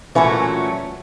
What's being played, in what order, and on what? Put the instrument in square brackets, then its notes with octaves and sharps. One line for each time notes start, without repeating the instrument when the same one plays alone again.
[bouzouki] A#2 F#3 A3 C#4 [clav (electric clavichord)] E3